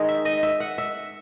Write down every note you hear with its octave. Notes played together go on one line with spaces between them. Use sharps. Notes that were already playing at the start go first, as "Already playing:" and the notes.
Already playing: D#3 G#3 D#4
E5
D#5
E5
F#5
E5